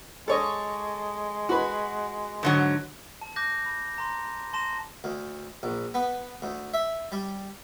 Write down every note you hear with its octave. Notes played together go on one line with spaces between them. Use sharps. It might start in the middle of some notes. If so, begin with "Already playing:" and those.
G#3 A4 C#5 D#5
F#4 B4
G#2 D3 F#3
A5
D6 F#6 G6 A#6
B5
A#5 C6
A5 C6 A#6 E7
D2
A#1
B3
D2
E5
G3